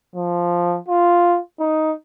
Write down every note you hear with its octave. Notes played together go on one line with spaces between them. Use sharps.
F3
F4
D#4